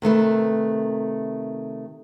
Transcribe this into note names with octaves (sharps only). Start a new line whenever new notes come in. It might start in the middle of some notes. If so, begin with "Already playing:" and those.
C3 D#3 A3 B4